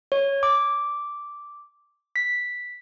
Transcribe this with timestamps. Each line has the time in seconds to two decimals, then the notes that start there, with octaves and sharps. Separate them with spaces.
0.12 C#5
0.43 D6
2.16 B6